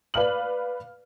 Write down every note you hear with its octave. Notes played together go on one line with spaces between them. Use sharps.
B4 D5 F5 F6 F#7